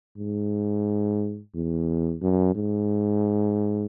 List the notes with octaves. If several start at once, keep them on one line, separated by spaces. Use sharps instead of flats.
G#2
E2
F#2
G#2